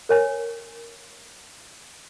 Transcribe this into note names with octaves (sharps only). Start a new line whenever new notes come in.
A#4 C#5 G#5